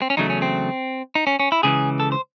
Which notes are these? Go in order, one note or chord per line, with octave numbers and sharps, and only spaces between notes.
C4
C#4
E2 C#3 F#3 A3 D#4
C#4
C4
D#4
C#4
C#4
E4
C#2 C#3 E3 G#4
A4
C5